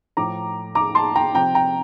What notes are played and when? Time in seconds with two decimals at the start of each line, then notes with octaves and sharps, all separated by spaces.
0.17 A2 F3 A#5 D6
0.75 A#5 D6
0.95 A5 C6
1.16 G5 A#5
1.34 C3 F3 G5 A#5
1.55 G5 A#5